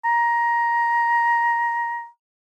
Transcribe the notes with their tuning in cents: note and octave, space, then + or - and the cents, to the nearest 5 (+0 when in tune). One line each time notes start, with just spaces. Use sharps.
A#5 +15